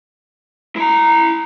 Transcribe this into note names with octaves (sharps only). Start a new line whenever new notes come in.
E4 A#5